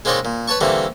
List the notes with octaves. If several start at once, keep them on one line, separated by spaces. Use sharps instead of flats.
G#3 A#3 C4 D#4 C#5 D5
A#2
B4 C#5 A5 C#6
D3 E3 G3 A3 A#3 C4